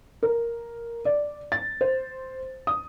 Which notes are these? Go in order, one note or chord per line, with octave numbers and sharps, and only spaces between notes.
A#4
D5
A6
C5
D#6